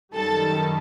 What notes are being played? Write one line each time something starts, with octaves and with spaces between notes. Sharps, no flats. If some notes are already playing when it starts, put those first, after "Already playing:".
F#2 D#3 G3 A4 A5